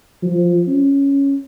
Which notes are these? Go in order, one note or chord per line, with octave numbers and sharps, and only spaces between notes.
F3
C#4